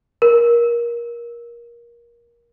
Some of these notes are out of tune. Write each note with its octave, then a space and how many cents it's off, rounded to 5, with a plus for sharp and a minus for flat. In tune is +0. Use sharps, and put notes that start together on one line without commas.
A#4 +20